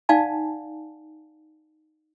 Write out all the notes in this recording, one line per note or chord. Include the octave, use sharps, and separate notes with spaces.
D#4 D5 F5 F#5 G#5 A5